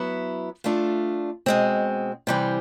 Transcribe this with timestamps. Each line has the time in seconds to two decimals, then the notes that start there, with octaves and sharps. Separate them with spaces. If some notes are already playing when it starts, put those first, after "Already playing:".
Already playing: F#3 B3 E4
0.64 A3 D4 F4
1.46 B2 G#3 C4
2.27 C3 E3 G3 C4